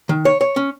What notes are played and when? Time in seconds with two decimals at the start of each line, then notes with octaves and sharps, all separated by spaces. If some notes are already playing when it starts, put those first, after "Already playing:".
0.09 D#3
0.25 C#5
0.41 C#5
0.56 C#4